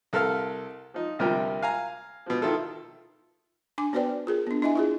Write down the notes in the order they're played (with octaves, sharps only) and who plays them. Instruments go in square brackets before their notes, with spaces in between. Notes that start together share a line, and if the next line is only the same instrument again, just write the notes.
[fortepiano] C2 A4 A#4 F5 F6
F3 D#4
D2 C3 F3 G3 A#4 G5
F5 G#5 A#5
B2 F3
D#3 E4 F4 A4
[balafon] D4 G#5 D6
B3 F#4 B4 C5 D5 G5
F4 G#4 A#4
B3 D4
D4 E4 D#5 E5 G#5
E4 F4 G#4